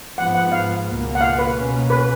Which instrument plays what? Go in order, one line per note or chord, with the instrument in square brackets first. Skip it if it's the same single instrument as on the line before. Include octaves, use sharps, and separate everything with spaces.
[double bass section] G#2 F3 B3 [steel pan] F#5
[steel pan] F#5
F5
[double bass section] C#2 B2 A#3
[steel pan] F#5
F5
B4
[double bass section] B2 A#3 C#4
[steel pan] B4